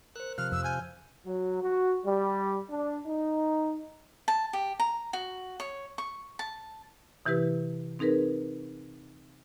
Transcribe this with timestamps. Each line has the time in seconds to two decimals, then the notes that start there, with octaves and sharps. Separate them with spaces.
0.16 A#4 C5 F#6
0.38 C3 F3 F6 F#6
0.52 F2 E6
0.64 G#5 F6 G6
1.26 F#3
1.62 F#4
2.05 G3
2.70 D4
3.07 D#4
4.28 A5
4.53 G4
4.80 A#5
5.13 F#4
5.60 C#5
5.98 C#6
6.39 A5
7.26 C3 E3 E4 G4 B4
7.99 C4 D#4 G#4 A#4 B4